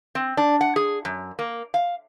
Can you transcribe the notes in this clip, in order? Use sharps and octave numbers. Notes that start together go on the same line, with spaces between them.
C4
D4
F#5
G#4
F#2
A#3
F5